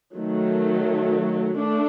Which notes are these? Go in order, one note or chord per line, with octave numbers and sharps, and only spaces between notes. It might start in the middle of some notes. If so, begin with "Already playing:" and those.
D#3 F#3 A3
A3 D4